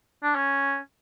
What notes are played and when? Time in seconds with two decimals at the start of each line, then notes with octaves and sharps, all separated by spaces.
0.23 D4
0.35 C#4